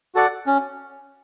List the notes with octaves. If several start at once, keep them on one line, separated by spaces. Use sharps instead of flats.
F#4 A4 D5 F#5
C#4